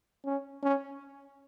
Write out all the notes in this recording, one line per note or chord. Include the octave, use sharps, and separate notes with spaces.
C#4
C#4